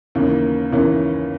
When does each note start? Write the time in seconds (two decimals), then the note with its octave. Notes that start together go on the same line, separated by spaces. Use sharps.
0.15 D#2 C#3 E3 A#3 C#4
0.72 D#2 C#3 E3 A#3 C#4